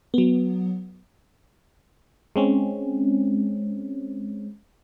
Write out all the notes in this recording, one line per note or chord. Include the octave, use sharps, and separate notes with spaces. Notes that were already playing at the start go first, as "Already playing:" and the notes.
F#3 B3
G#3 C4 C#4